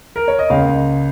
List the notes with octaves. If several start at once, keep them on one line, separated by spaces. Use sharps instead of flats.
A#4
C#5
D#5
C#2 C#3 A#3 F5